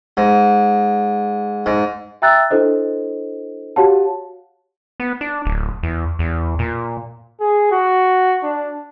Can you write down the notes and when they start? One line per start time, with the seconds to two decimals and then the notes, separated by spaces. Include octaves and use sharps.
0.17 G#2
1.66 G#2
2.22 E5 G5 A#5 E6 F#6 A6
2.51 D4 E4 A4 C5 D#5
3.76 F#4 G4 C#5 F5 F#5 A5
5.00 B3
5.21 D4
5.45 D1
5.83 E2
6.19 E2
6.59 A#2
7.40 G#4
7.72 F#4
8.44 D4